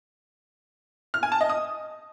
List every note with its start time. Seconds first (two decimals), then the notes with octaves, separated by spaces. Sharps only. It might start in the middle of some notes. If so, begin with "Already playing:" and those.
1.14 F6
1.23 G#5
1.32 A5
1.41 D#5
1.50 D#6